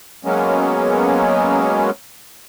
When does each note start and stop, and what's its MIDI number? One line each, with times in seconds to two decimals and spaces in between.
0.25 1.90 54
0.25 1.90 56
0.25 1.90 58
0.25 1.90 59
0.25 1.90 61